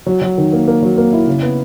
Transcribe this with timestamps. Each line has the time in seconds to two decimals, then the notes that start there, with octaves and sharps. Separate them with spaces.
0.06 F#3
0.21 F#3
0.38 D#3
0.53 A#3
0.68 A#3
0.82 F#3
0.98 A#3
1.13 E4
1.27 C#3
1.42 B3